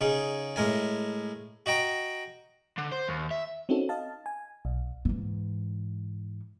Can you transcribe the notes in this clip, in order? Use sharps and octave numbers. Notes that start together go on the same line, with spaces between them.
C#3 D#4 G#4
A2 G#3 A#4 G#5
F#4 D#5 G5 A#5
D3
C5
D#2
E5
C4 C#4 D#4 F#4 A4
D#5 F5 A5
G#5
B1
G#2 E3